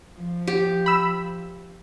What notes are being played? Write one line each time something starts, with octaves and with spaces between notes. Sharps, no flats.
F3
G4
B5 E6